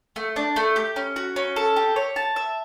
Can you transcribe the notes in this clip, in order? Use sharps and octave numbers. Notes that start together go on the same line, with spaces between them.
A3
D4
A3
G4
C#4
F#4
C#4
A4
G4
C#5
A5
E5